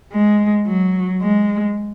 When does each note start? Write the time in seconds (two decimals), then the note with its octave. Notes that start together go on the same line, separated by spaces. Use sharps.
0.12 G#3
0.67 F#3
1.22 G#3